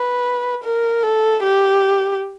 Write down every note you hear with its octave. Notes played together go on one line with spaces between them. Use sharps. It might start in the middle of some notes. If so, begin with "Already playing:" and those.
Already playing: B4
A#4
A4
G4